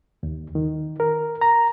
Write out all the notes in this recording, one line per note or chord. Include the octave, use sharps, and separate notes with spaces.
D#2
D#3
A#4
A#5